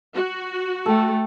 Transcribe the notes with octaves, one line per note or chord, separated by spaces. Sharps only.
F#4
A3 A4 G5